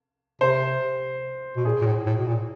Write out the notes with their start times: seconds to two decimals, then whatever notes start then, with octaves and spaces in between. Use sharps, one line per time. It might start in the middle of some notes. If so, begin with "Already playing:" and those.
0.41 C3 C5
1.57 B2
1.65 A#2 G#4
1.81 A#2
1.86 A2
2.06 A2
2.17 B2
2.27 A#2